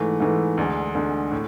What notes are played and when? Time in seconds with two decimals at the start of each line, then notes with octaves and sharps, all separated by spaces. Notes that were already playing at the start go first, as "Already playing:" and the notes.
Already playing: G#2 E3 A3
0.20 G#2 E3 A3
0.57 D2 D3 G#3
0.95 D2 D3 G#3
1.32 A2